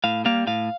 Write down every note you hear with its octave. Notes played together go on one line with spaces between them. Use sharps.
A2 F5
G3 A#3 F5
A2 F5